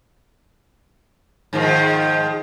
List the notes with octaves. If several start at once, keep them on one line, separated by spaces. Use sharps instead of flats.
G#2 D#3 F3